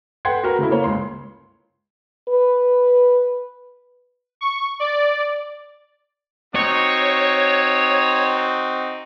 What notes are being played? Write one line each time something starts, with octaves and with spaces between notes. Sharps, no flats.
A4 B4 F#5 G5 C6 G#6
F#4 A#4 B4
C#3 A3 E4
A#3 C#5
C#2 C6
B4
C#6
D5
C4 D#4 F#4 C#5